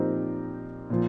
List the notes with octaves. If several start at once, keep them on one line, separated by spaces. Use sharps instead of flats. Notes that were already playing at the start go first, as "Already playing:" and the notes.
Already playing: A#2 F3 C4 D#4 G4 A#4
A#2 F3